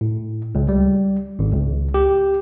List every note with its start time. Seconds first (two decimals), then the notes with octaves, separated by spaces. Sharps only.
0.01 A2
0.55 C#2
0.69 G3
1.39 G#1
1.52 C#2
1.94 G4